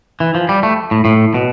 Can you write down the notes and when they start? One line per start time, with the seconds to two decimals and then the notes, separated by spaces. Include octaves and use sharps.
0.20 E3
0.35 F3
0.49 G3
0.63 A3
0.91 A2
1.05 A2
1.34 B2